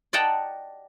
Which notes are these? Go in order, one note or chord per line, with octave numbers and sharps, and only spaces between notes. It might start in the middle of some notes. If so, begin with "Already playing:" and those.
D5 D#5 F#5 G5 A5 A#5